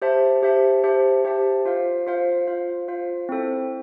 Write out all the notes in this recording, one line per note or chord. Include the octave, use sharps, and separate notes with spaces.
G4 C5 E5 A5
G4 C5 E5 A5
G4 C5 E5 A5
G4 C5 E5 A5
F4 C5 F5
F4 C5 F5
F4 C5 F5
F4 C5 F5
C4 E4 A4 C5